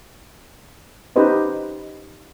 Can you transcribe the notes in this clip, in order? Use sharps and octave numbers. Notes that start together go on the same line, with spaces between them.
C#4 D#4 G4 B4 C5 D#5